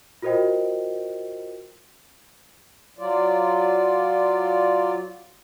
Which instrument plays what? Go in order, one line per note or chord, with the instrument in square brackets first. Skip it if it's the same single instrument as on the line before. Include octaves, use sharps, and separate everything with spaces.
[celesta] F4 F#4 A#4 C5 D#5 G5
[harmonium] F#3 F4 D5